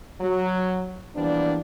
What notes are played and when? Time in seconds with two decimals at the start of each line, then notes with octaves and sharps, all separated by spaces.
0.21 F#3
1.16 E3 F3 G3 A#3 B3 D4